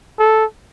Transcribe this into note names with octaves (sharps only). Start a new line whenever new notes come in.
A4